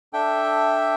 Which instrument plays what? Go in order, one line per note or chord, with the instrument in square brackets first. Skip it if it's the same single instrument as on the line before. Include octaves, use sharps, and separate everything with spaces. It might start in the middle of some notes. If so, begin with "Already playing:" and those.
[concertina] D4 A4 E5 G5